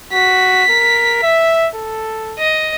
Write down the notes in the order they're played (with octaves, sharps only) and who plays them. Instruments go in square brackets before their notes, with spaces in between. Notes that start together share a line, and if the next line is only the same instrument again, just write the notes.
[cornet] F#4 [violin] B6
[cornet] A#4
E5
A4
[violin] D#5